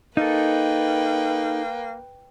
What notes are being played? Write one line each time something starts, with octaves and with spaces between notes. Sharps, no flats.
A#3 D#4 A4 B4 G5